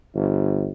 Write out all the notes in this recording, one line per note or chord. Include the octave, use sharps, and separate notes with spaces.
G1